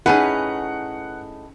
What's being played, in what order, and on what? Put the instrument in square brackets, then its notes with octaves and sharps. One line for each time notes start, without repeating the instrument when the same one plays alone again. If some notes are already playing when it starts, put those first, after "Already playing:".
[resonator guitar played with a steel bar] A2 D#4 G#4 [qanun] C#4 B4 [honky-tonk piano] F#5